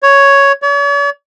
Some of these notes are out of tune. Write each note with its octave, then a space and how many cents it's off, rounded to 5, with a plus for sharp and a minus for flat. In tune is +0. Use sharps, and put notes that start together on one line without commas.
C#5 +5
C#5 +45